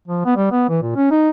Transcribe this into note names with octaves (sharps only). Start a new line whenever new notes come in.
F3
B3
G3
B3
E3
A#2
C#4
D#4